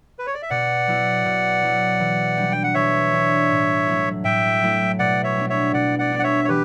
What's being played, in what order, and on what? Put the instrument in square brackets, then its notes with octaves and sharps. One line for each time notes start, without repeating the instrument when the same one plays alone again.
[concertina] B4
C#5
D5
E5
[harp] B2 [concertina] D5 F#5
[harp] F#3 B3 E4
B2
F#3 B3 E4
E3
G3 D4
[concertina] G5
F#5
[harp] E3 [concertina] C#5 E5
[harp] G3 D4
A2
F#3 A3 E4
[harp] A2 [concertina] E5 G5
[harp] F#3 A3 E4
[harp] B2 [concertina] D5 F#5
[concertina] C#5 E5
[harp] G3 B3 D4
[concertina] C#5 E5
[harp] B2 [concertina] D5 F#5
[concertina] D5 F#5
[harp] G3 B3 D4
[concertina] F#5
C#5 E5
C#5
[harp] E3 [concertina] G4 B4